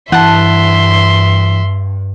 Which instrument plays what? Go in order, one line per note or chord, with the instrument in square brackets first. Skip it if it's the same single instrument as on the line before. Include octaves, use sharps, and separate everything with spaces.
[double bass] G2 [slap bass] E3 [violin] E5 C6 [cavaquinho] F#5 A5